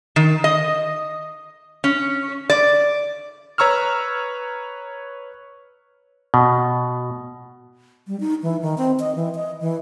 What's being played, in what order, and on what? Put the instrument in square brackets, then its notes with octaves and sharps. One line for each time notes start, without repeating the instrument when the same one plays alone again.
[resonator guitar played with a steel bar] D#3
D#5
C#4
D5
[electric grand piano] B4 C#5 A#5 C#6 E6 F6
[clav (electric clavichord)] B2
[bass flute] G3
D#4
E3
D#3
C4
D#5
E3
D#5
E3